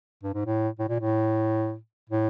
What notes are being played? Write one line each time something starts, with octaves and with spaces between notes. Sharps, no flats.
G2
G#2
A2
A2
A#2
A2
A2